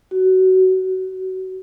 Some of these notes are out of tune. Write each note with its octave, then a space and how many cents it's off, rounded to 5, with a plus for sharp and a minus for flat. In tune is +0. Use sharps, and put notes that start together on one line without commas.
F#4 +20
F#4 +25